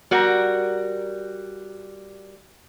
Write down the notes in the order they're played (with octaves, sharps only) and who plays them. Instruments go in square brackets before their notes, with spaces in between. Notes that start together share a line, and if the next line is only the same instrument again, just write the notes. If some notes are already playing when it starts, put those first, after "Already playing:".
[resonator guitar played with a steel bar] G3 F#4 A#4